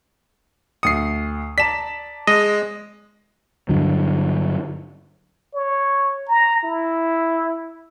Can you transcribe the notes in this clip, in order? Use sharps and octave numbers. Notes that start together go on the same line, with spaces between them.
D2 D#6 C7 C#7
D5 A5 A#5 B6 E7
G#3 D#5
G2 D3 F#3
C#5
A#5
E4